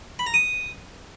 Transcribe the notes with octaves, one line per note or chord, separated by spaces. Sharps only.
B5
A#5
D#6